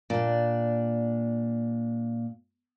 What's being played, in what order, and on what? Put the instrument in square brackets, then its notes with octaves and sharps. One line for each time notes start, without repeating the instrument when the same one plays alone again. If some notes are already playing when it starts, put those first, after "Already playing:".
[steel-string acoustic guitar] A#2 D4